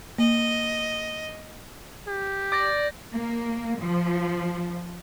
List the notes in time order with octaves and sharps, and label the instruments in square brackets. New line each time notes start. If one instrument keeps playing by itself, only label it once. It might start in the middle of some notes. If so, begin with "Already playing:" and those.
[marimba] A#3 [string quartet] D#5
[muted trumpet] G4
[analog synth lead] D5 [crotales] G6 A6 A#6
[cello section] A#3
F3